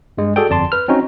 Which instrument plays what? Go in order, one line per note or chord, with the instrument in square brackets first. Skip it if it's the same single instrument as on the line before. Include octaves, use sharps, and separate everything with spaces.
[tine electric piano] G2 G#3
F#4 G#4 A4 D5 G5
G1 F2 D5 A5 C6
B4 F6
C4 C#4 D#4 F#4